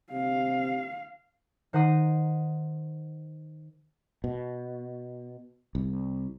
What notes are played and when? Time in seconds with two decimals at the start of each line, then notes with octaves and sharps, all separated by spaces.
0.12 C3 F5
1.73 D#3 C5 F#5 A#5 D#6 C7
4.24 B2
5.75 C2